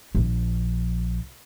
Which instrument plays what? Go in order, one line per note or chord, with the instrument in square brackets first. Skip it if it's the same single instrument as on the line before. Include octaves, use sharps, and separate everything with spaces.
[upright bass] A#1 F3